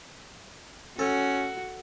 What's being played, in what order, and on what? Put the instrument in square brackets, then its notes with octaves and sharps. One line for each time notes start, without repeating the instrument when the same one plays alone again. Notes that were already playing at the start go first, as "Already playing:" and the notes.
[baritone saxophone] C#4 [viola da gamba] F#4 [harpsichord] A4